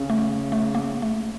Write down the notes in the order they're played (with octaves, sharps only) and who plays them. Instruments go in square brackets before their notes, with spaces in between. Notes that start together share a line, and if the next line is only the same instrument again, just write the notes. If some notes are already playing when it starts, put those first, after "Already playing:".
Already playing: [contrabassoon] C#3
[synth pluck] A3
A3
A#3
A3